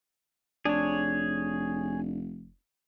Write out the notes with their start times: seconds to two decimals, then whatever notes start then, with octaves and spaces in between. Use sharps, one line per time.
0.65 F1 D4 G#4 C#5